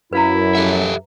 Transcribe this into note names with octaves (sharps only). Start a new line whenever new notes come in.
F#2 E4 B4 F5 A#5
G4 A4 E5